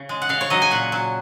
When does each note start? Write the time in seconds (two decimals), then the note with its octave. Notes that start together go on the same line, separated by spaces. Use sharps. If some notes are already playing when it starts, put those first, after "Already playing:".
Already playing: C#3
0.09 G#3
0.22 F#5
0.29 C#3 F5
0.41 C#5
0.50 F#3 D#5
0.62 G#5
0.71 A#2 F#5
0.92 F#3